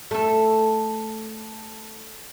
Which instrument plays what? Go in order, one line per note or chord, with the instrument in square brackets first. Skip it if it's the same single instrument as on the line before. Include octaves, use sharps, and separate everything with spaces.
[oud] A3 A4